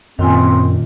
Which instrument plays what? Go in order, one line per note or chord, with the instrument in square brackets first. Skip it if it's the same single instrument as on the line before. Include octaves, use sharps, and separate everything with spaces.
[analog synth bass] F#2 [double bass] A#2 [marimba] D#3 F4 G#5 [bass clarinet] C4